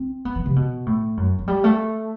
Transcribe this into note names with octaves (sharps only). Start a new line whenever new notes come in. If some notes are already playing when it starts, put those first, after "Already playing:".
Already playing: C4
B3
E3
C3
B2
A2
F#2
F#3
G3
A3